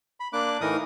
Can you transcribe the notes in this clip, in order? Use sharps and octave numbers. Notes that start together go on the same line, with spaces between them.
B5
A#3 D4 D6 F#6
A2 E3 D#4 A#4 D#6